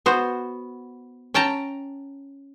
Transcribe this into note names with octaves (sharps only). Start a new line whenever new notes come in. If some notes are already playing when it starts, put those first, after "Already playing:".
B3 F#4 C5
C#4 G5 A5 A#5